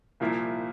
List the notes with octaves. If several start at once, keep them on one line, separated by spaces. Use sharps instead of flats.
C2 A#2 F3 A#3 E4